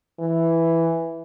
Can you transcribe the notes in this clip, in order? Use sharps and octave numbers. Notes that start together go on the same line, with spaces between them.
E3